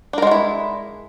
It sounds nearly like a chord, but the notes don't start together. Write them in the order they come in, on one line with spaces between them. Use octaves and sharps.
D4 A#4 G#3 F#4 E4